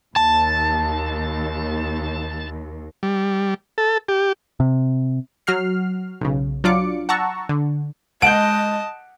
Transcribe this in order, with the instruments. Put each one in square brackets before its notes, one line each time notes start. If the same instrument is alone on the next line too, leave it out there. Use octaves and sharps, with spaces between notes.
[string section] D#2 [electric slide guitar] A5
[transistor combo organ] G3
A4
G4
[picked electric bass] C3
[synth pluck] F#3 F#4 F6 C7
B1 C#3
F#3 D4 F4 D5 D6 C#7
F#5 A5 A#5 C#6 E6
D3
[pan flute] G#3 [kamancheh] D#5 A5 [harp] F#5 G6 [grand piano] D7